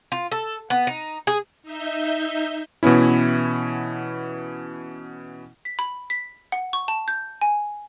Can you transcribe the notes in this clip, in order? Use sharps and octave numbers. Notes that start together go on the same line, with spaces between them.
F4
A4
B3
D#4
G#4
D#4 E5 G6
B2 E3 B3 C#4 E4
B6
B5
B6
F#5
C#6
A5
G6
G#5